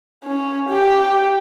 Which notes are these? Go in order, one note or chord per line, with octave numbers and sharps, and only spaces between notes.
C#4
G4 G5